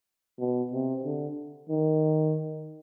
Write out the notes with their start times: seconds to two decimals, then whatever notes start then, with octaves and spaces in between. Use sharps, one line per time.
0.39 B2
0.72 C3
1.04 D3
1.69 D#3